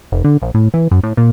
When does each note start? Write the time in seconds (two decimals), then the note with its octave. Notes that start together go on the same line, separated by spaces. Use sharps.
0.12 F1
0.24 D3
0.42 A#1
0.54 A2
0.74 E3
0.91 F#2
1.03 A2
1.17 A#2